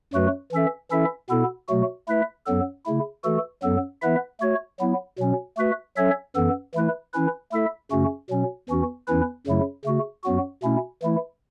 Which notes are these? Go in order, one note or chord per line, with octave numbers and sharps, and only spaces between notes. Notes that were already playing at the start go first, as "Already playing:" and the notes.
F#2 F#3 A3 F#4 B4
E3 C#4 A4 E5
E3 C#4 E4 A4 E5
B2 B3 E4 A4
B2 F#3 A3 F#4
A3 E4 B4 E5
F#2 F#3 B3 A4
C#3 A3 E4
E3 A3 F#4 A4
F#2 F#3 B3 A4
E3 B3 E4 B4 E5
A3 F#4 C#5
F#3 B3 E4
B2 F#3 C#4
A3 F#4 B4 E5
F#3 C#4 A4 C#5 E5
F#2 E3 B3 A4
E3 A3 E4 B4
E3 C#4 E4 B4
A3 E4 A4 E5
F#2 C#3 A3 C#4 F#4
B2 F#3 C#4
E2 E3 C#4 F#4
E2 E3 C#4 E4 B4
F#2 C#3 F#3 A3 E4
C#3 A3 F#4
F#2 F#3 B3 F#4
B2 A3 C#4 E4
E3 A3 E4